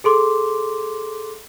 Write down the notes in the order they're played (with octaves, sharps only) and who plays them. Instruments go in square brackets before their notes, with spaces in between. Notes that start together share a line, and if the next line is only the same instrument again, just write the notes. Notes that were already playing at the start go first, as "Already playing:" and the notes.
[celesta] G#4 A4 C6 D6